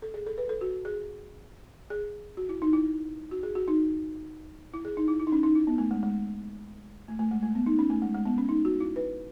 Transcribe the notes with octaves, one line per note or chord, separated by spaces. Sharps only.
A4
G#4
A4
B4
A4
F#4
G#4
G#4
F#4
E4
D#4
E4
F#4
G#4
F#4
D#4
E4
G#4
D#4
E4
E4
D#4
C#4
D#4
E4
B3
A3
G#3
G#3
A3
A3
G#3
A3
B3
D#4
C#4
A3
G#3
G#3
B3
C#4
D#4
F#4
E4
B4